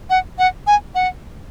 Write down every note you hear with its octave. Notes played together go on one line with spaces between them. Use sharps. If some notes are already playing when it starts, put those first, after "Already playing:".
F#5
F#5
G#5
F#5